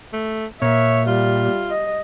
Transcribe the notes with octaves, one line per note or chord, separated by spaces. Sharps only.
A3
A#2 C#5 E5
G3 F4
D#5